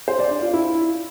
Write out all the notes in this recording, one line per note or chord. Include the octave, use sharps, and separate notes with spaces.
C5
D5
D4
F4
E4